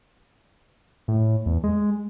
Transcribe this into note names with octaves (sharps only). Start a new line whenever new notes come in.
A2
E2
G#3